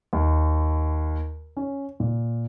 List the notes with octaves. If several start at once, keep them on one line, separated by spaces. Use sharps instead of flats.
D#2
C#4
A#2